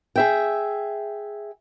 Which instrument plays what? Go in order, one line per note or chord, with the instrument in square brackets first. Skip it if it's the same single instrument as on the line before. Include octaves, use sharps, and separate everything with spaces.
[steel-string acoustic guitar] G#4 E5 G5